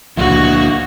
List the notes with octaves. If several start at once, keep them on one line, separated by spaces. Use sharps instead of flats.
C#2 A#2 D3 F3 E4 F#4